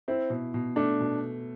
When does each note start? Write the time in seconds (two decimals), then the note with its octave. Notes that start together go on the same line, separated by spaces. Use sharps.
0.08 C4 E4
0.30 B2
0.54 B2
0.76 A3 D4
1.00 B2